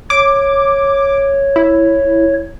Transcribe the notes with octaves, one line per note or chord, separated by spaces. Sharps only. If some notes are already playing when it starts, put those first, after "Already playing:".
C#5 D6
E4